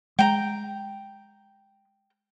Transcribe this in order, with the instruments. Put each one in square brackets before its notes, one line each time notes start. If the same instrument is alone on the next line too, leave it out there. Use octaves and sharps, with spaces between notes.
[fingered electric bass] G#3 [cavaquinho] G5 A#5